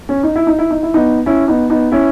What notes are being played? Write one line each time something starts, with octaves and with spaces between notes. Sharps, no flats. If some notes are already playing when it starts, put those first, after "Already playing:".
C#4
D#4
E4
D#4
E4
D#4
E4
B3 D#4
C#4 E4
B3 D#4
B3 D#4
C#4 E4